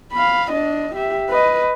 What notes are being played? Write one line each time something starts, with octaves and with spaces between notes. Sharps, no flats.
F5 B5
D4 D#5
G4 E5
B4 D#5